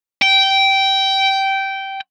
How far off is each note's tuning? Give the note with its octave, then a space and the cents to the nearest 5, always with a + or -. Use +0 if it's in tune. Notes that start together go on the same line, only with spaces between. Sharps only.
G5 -15